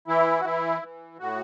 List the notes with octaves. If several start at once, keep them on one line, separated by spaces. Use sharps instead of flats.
E3 E4
F#4
E3 E4
E3
A2 F#4